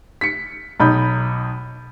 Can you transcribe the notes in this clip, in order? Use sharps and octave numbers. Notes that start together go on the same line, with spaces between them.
B6 C#7
B1 D#4 B5 G6